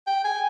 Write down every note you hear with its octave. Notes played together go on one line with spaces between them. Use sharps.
G5
G#5